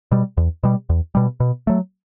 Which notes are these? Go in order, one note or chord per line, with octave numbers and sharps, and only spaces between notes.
B2 G3
E2
B2 G3
E2
B2 G3
B2
F#3 A3